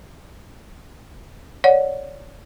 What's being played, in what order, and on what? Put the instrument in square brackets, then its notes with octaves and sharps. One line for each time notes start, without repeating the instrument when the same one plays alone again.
[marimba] C#5 D5 F#5